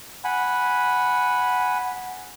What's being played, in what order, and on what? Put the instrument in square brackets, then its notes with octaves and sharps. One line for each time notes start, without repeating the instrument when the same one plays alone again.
[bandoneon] F#5 G#5 B5